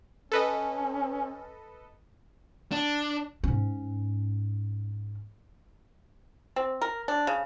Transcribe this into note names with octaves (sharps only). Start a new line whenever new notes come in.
C#4 A4 B4 D#5
D4
G#2 C#4
C4
A#4
D4
C#3